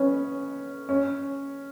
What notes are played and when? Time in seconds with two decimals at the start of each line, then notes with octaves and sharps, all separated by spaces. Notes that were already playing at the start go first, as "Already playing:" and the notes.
Already playing: B3 C#4
0.89 C#4